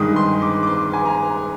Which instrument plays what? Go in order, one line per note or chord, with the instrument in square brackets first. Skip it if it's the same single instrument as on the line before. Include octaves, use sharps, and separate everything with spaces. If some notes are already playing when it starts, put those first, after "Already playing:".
Already playing: [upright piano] G2 D#3 G#3 D#6
C6
D6
D6
C6
G#5
A#5